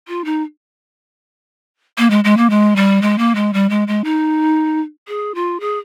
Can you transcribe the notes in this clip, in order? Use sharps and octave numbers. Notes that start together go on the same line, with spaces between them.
F4
D#4
A#3
G#3
G#3
A#3
G#3
G3
G#3
A#3
G#3
G3
G#3
G#3
D#4
G#4
F4
G#4